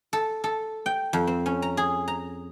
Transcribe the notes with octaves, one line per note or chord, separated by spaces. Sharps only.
A4
A4
G5
F2
C4
C#4
A#5
G#4
A#5